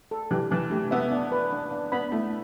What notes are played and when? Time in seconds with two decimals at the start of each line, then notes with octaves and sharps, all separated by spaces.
0.11 A4
0.31 E3 G4
0.51 E3 A5
0.71 A3 G4
0.91 B3 E5
1.12 D4
1.32 B4
1.52 D4
1.71 D4
1.92 B3 B5
2.12 A3 E4